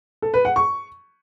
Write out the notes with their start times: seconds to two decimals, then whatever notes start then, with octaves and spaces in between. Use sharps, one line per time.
0.22 A4
0.34 B4
0.45 F#5
0.56 C#6